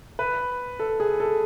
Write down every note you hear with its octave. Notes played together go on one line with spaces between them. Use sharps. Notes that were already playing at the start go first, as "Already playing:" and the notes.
B4
A4
G#4
A4